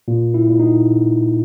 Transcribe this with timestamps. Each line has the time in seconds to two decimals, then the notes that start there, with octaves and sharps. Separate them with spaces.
0.08 A#2
0.34 E4
0.47 A#2
0.59 D#4